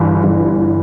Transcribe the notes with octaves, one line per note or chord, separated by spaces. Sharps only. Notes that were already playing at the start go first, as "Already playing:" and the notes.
Already playing: G1 E3
G1